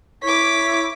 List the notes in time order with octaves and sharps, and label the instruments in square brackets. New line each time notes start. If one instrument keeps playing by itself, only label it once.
[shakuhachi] E4 [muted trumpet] C#5 [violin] D6 B6